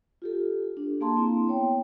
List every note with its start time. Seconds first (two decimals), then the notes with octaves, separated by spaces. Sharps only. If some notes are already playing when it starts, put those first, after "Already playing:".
0.22 F4 G4 A4
0.77 D4
1.01 A#3 G#4 F5 A5 A#5 C6
1.16 A#3 C4 E4
1.48 B3 C#5 G5